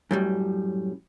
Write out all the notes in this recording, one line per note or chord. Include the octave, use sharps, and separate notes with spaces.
F#2 A2 G3